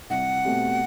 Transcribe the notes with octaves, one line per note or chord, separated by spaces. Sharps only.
C2 F#5
B2 A3 C4 G4